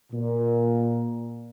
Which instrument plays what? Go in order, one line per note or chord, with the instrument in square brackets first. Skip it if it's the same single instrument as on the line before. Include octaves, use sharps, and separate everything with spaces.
[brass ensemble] A#2